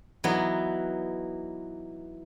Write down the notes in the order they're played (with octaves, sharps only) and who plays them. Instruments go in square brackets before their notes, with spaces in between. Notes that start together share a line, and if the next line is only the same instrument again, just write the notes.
[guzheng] E3 F#3 B3 D#4